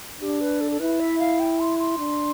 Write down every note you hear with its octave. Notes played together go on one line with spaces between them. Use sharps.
D4 G4
B4
A4
A4
E4 B4
E5
F5
G5
C6
C6
D4